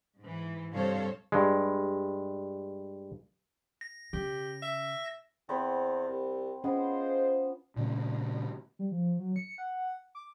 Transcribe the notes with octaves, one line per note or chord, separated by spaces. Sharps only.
G#2 E3
G2 C3 A4 C5 C#5 F5
G2 G#3
A#6
C#3 G4
E5
E2 C4 F#5 B5
C2
G#3 B3 C#4 F4 C5
A#2 C#3 A3
G3
F3
F#3
C#7
F#5
D6